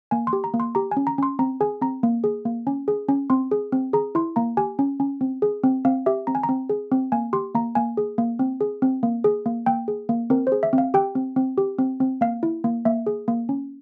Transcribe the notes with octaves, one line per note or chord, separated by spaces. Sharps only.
A#3 G#5
C6
G4
A#5
A#3
C6
G4 A#5
G#5
C#4
A#5
C#4 C6
C4 A#5
G#4 G#5
C4 A#5
A#3
G#4
A#3
C#4
G#4
C#4
C4 C6
G#4
C4
G#4 A#5
E4 C6
A#3 A#5
G4 G#5
C#4
C#4
C4
G#4
C4
C4 F5
G4 E5
C4 A#5
G#5
A#5
C4
G#4
C4
A#3 G#5
G4 C6
A#3 A#5
A#3 G#5
G#4
A#3
C4
G#4
C4
A#3
G#4
A#3
A#3 G5
G#4
A#3
C4 A#4
C5
G#4
E5
C4
F5
G4 G5
C4
C4
G4
C4
C4
A#3 F5
E4
A#3
A#3 E5
G#4
A#3
C#4